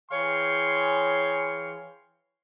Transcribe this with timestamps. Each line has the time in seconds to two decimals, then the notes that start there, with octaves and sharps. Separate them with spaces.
0.11 E3 G#4 C#5 F5 G5 C6